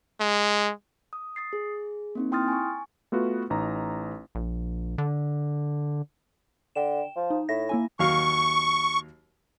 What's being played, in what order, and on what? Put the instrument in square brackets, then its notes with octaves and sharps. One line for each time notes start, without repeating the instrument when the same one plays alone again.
[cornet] G#3
[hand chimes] D#6
D#6 A6 C7
G#4
A#3 C4 D#4
E4 G5 C6 D#6 F6 A6
G#5 C#6
[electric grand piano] A3 B3 F4 F#4 B4
A1 D#4 A#5
[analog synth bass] A#1
D3
[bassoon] D3 [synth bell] G5 E7
[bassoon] F3
[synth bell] D#4
[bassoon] A2 [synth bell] E5 A#6
[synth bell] A#3 E4 G#5
[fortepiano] D#2 F#3 F5 [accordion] C#6